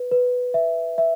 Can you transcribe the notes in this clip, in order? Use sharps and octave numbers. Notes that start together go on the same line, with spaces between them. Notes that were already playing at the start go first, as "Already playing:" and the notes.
Already playing: B4
B4
E5
E5